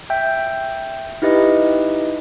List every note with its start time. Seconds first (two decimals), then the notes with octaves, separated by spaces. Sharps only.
0.10 E5 G5 G6
1.22 D#4 E4 G4 B4 D#5